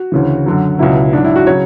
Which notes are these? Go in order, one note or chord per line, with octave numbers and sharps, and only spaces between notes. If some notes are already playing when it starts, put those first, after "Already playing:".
Already playing: F#4
D2 C#3 E3
F#2 D3 F#3
C#2 B2 F#3 E4
G#2 F#3 D4
E4
F#4
C#3 F#3 C#5